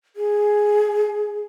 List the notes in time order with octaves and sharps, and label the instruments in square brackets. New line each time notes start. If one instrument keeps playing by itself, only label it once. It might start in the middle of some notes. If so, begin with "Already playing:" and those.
[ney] G#4